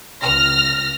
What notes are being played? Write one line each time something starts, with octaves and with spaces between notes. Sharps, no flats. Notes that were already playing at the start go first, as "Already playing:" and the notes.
C#2 F6 A#6